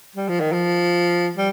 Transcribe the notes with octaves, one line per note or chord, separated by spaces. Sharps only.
G3
F3
D#3
F3
G3